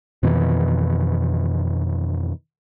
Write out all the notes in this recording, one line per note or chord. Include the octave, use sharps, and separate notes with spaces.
F2 B2 D#3 E3